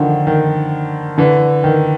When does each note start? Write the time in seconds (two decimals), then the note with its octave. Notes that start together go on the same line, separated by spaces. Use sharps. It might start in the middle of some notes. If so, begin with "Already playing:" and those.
Already playing: D3 D#3 F3
0.27 D#3
1.18 D3 E3
1.64 D#3